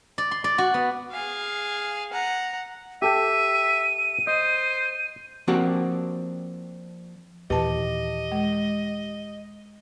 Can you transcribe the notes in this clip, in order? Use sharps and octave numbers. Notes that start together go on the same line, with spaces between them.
D5
C6
D5
F#4
B3
G#4 F5
F#5 A#5
G4 A4 E5 G5 D#7
C5 D#5
F3 A#3 C4 D4 F#4 G4
D#2 A#2 E3 G4 B4 D#5 A5
G#3